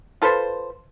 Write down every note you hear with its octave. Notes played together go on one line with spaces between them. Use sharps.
F4 A4 B4 C5